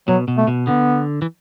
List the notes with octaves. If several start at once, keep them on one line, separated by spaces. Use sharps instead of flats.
B2 F#3
B2
A3
B2
D3 B3
E3